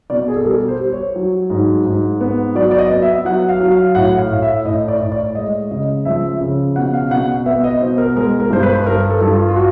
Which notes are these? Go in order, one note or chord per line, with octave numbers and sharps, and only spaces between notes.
B2 D5
G#4
A4
G3 A#4
C5
G3
C#5
F#3
G#2
G#2
B3
F#3 D5
D5
D#5
B3
E5
F#3 F#5
F5
F#3
F5
A2 F#5
F5
A2
E5
A2 D#5
D5
A2
D5
G#3 D#5
C#3 D#5
F3 E5
C#3
B2 F#5
F5
B2 F#5
F#5
B3 E5
D#5
B2 C5
A#4
G#3 A#4
A#4
G2 C5
B4
G2 A#4
A4
G2
F4
F4
F#4